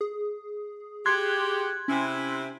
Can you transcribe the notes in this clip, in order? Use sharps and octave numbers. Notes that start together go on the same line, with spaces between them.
G#4
F#4 G4 C6 F#6 G#6
C3 C#4 E4